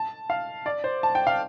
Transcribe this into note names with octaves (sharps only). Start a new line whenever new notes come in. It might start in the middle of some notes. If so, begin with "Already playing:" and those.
Already playing: A5
F5
D5
C5
A5
G5
F5